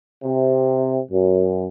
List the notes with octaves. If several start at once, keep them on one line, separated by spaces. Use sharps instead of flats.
C3
F#2